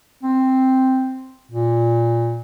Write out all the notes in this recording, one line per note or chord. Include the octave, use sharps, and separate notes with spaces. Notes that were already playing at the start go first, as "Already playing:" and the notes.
C4
A#2